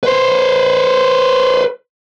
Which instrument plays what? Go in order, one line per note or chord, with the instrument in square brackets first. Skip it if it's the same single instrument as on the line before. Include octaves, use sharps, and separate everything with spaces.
[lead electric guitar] B4 C5